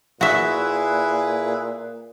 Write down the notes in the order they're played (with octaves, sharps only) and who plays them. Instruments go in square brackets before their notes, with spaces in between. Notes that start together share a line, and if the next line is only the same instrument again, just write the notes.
[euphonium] A#2 [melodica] E4 G#4 B4 [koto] F#4 E5